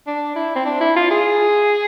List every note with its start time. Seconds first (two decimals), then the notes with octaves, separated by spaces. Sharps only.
0.07 D4
0.36 E4
0.55 C4
0.65 D4
0.81 E4
0.96 F4
1.10 G#4